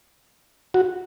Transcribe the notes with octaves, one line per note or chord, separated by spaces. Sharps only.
F#4